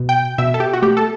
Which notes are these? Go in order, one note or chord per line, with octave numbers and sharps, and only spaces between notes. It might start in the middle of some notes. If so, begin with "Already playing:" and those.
Already playing: B2
G5
B2 E5
A4
G4
F#4
A3 G4
A4